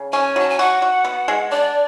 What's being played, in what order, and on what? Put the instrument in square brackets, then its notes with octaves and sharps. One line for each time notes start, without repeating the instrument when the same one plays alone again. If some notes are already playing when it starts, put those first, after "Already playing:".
Already playing: [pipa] C#3
[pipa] C#4 [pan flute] G#5
[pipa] F#3 [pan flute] A5
[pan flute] G#5
[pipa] F#4 [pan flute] F#5
[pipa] F#4
B3
G#3
[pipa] D4 [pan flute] D5